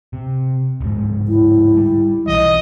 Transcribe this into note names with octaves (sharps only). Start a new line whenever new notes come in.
C3
D1 G#2
E4
G3
B1 E3 D#5